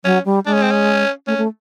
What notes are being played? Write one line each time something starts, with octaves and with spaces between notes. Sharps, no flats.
F#3 C#4
G3
G#3 D4
C#4
C4
C#4
A3 C#4
A3